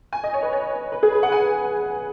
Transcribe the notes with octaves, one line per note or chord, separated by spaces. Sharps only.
G#5
D#5
C#5
B4
C#5
B4
G#4
B4
F#5
G#5